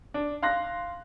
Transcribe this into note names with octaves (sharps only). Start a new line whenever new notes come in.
D4
F5 C6 F#6 A#6